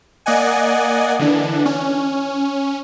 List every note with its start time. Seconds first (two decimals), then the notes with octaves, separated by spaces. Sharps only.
0.26 A#3 D5 D#5 F#5 G#5
1.19 D3 E3 D4
1.66 C#4